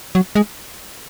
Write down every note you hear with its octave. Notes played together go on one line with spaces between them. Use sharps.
F#3
G#3